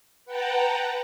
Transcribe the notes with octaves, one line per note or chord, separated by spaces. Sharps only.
B4 F#5 G5 A5 A#5